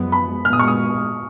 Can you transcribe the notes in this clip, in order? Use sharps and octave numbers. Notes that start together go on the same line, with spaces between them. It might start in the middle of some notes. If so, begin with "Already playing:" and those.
Already playing: F#2 F3 G#3 B3
B5
A#2 G#3 B3 F6
D#6
C#6
D#6